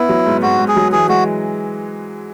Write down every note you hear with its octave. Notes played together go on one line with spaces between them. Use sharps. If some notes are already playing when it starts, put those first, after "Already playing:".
Already playing: B3 E4
F#3
G#2
G#2 F#4
G#2
G#4
F#3
E3 G#4
G#3 F#4